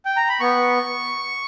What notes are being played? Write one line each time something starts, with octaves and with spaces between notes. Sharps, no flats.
G5
A#5
B5
B3 C#6